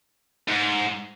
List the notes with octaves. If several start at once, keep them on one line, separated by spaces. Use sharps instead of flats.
G#2